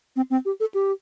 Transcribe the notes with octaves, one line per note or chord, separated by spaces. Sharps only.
C4
C4
G4
A4
G4